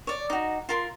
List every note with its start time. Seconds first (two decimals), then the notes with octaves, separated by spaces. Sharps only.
0.07 C#5 D5
0.30 D#4 F#4
0.69 F4 A#4 C6